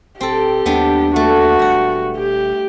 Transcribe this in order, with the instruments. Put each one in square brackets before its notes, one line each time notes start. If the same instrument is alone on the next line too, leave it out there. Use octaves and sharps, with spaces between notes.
[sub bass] D1 [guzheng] C4 A4 [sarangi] G4
[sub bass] D#2 [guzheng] G3 B3 D4
[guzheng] A3 [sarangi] F#4
[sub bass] E1 [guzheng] G3 F#5
[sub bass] D#1 [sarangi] G4